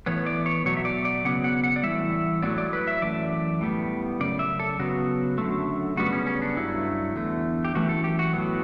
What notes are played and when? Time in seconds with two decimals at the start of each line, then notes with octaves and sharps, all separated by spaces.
0.06 A2 E3 B3 C#5
0.26 D5
0.46 C#5
0.66 B2 F#3 A3 C#5
0.77 E5
0.85 D5
1.05 D5
1.25 C#3 F#3 B3 F#5
1.44 F#5
1.64 F#5
1.76 D5
1.83 A2 E3 G3 E5
2.42 A2 F#3 B3 D5
2.58 D5
2.73 B4
2.87 E5
3.02 F#2 E3 A3 D5
3.61 A2 G3 B3
4.20 F#2 C#3 D5
4.39 E5
4.60 A4
4.79 C#3 F#3 B3 F#4
5.38 F#2 D3 A3
5.97 C#3 G3 B3 F#4
6.13 C#4
6.27 C#4
6.42 D4
6.56 G2 F#3 A3 E4
7.16 E2 D3 A3
7.65 G4
7.75 F#2 E3 A3 F#4
7.89 A4
8.04 G4
8.19 F#4
8.33 A2 F#3 B3